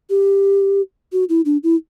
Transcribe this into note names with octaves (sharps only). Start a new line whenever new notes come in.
G4
F#4
E4
D4
E4